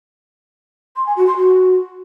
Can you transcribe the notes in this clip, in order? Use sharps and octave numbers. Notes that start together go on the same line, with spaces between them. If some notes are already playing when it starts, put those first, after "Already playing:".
C6
G#5
F#4
C6
F#4